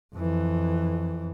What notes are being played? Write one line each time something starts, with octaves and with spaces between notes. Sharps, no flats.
F2 E3